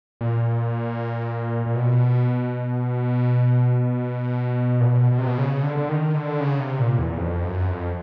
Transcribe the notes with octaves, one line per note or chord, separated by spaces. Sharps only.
A#2
A#2
B2
A#2
B2
B2
C3
B2
C#3
D3
D3
D#3
D3
C#3
C3
A#2
E2
F2
F#2
F2